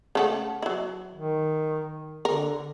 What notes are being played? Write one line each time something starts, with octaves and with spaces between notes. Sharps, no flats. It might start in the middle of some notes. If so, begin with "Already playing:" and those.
C#3 A3 F#5
F#3 E4
D#3
D3 A#4